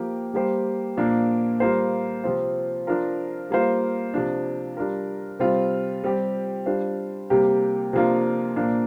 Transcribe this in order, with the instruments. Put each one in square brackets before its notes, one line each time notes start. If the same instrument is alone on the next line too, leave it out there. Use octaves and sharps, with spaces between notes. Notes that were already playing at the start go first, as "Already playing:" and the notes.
Already playing: [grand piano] F3 A#3 G4
G3 A#3 G4 C5
A#2 F3 A#3 D4
G3 A#3 F4 C5
C3 F3 C4 F4
F3 D4 F4 A#4
G3 A#3 F4 C5
C3 F3 D4
G3 D4 F4 A#4
C3 G3 C4 F4
G3 C4 G4
G3 D4 F4 C5
C3 G3 A#3 G4
C3 F3 A#3 D4 F4
A#2 F3 A#3 D4